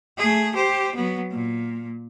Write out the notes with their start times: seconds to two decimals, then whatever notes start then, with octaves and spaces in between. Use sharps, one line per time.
0.18 A3 G#4
0.54 G4 C5
0.95 F#3 B3
1.31 A#2